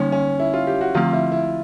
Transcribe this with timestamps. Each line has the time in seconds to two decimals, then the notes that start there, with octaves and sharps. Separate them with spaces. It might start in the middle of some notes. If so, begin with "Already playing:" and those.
Already playing: D3 G3 A#3 C#4 D#4
0.12 C#4
0.40 E4
0.54 F4
0.67 G4
0.81 F#4
0.95 D3 F3 A3 C4 F4
1.13 E4
1.32 E4